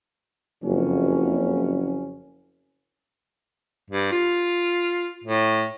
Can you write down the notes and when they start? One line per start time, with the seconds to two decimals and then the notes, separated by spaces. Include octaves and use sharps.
0.63 F#1 F2 C#4
3.90 G2
4.12 F4
5.24 A2